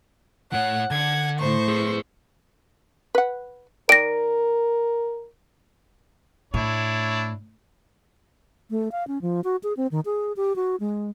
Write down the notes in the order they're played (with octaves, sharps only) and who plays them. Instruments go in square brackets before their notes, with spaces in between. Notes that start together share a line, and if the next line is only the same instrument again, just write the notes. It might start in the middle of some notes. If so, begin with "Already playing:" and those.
[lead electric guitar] A2 C#5 [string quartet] F#5
[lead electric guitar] D3 [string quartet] F#5 G#6
[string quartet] A2 C5 C#6
[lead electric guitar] G#4 B4
[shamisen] B4 F#5
[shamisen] D#3 D5 G5 [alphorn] A#4 [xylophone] A#6 D7
[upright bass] A2 [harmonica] D4 E4 C#5
[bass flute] A3
F5
C#4
F3
F#4
G#4
C4
D#3
G#4
G4
F#4
G#3